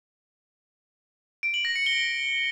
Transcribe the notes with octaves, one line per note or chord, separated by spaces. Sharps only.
D7
F#7
A#6
C#7
G7